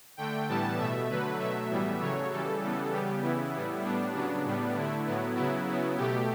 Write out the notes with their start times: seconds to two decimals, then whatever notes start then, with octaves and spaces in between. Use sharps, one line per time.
0.17 D3 A3 G5
0.48 A2 E3 G3 B3 A5
0.78 B2 A3 E5
1.09 D3 F#3 A3 B4
1.39 B2 F#3 A3 E5
1.69 A2 E3 G3 B3
2.00 C#3 F#3 A3 C#5
2.31 C#3 E3 G3 A4
2.61 C#3 E3 G3 B3
2.92 C#3 G3 B3 G4
3.22 C#3 E3 B3 E4
3.54 A2 G3 B3
3.83 A2 G3 B3 D4
4.14 C#3 F#3 B3 D4
4.45 A2 G3 B3
4.75 D3 A3 E4
5.06 A2 F#3 B3
5.36 C#3 F#3 B3 E4
5.67 C#3 F#3 B3
5.97 B2 A3 G4